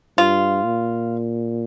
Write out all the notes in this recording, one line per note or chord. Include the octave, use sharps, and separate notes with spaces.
G2 F4
A#2